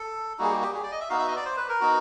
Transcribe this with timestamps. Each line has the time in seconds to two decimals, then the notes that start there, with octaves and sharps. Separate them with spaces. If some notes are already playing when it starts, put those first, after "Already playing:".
Already playing: A4
0.38 G3 A#3 D#4 F#4 G#4
0.50 G4
0.62 G4
0.74 G#4
0.83 D5
0.92 D#5
1.00 E5
1.10 B3 D#4 F#4 F5
1.19 E5
1.28 D#5
1.36 D5
1.45 C5
1.57 B4
1.69 A#4
1.81 B3 D#4 F#4